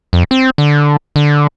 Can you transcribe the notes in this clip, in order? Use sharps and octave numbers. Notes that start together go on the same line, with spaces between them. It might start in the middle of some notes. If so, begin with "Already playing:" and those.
F2
C4
D3
D3